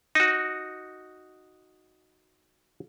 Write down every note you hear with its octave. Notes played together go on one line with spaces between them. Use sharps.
D#4 F#4